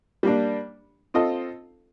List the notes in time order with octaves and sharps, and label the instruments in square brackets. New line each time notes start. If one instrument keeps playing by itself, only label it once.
[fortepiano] G3 A#3 D4
C4 F4 A4 D#5